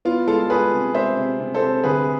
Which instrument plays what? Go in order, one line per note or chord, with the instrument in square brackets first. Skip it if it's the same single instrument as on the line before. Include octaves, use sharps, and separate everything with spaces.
[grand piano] B3 F4
G#3 F4 A4
G#3 G#4 B4
C3
G#3 C5 E5
C3
C3
A4 C5
C3
D2 G#4 B4